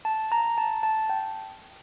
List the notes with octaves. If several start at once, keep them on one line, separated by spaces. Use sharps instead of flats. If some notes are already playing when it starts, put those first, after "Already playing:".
A5
A#5
A5
A5
G5